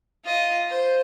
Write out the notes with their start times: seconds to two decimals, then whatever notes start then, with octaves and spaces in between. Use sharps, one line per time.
0.25 F4 D#5
0.69 C5